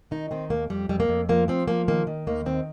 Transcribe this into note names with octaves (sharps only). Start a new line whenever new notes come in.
D#3 D#4
D#3 C4
D#2 A#3
F2 G3
F2 G3
A#3
F2
F3 A#3
F3 C4
F3 A#3
D#3 A#3
D#3
D#2 A#3
D#3 C4